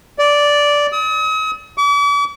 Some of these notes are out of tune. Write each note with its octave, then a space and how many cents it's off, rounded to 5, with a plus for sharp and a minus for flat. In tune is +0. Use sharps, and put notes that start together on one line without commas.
D5 -10
D#6 +40
D6 -45